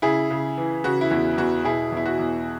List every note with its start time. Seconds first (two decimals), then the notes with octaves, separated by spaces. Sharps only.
0.02 C#3 E4 G#4
0.30 C#3
0.57 E3
0.84 C#3 F#4
1.01 E4
1.10 E2 F#4
1.37 E2 F#4
1.64 B2 E4 G#4
1.92 E2 E4
2.06 F#4
2.19 E2